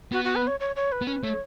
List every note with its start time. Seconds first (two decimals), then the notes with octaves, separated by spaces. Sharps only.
0.12 B3 F#4
0.25 F#4
0.36 B4
0.47 C#5
0.60 C#5
0.76 C#5
0.92 B4
1.02 B3
1.07 C#4 B4
1.23 A3 C#5